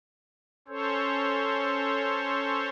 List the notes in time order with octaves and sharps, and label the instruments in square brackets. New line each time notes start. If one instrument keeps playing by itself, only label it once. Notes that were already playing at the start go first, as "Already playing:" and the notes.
[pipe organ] C#4 A4 C5 C#5